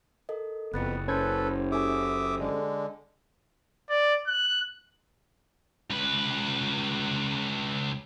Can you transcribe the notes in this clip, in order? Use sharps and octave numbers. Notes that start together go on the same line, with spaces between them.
A4 A#4 D#5
F#1 F2 B3 F#6 A6 C#7
C#4 A4 B4 C5 G#6
G4 A4 E5 G#5 D6 D#6
D3 G#3
D5
F#6
C#2 B4